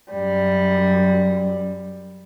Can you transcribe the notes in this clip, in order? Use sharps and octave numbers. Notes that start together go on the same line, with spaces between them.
F#2 G3